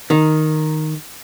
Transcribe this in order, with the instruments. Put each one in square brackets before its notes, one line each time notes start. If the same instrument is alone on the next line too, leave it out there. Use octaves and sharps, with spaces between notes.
[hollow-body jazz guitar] D#3